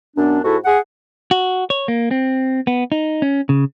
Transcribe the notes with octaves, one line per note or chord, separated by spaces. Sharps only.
F#2 B3 D4
G#2 E4 F#4 A4
G#4 F#5
F#4
C#5
A#3
C4
B3
D#4
C#4
C#3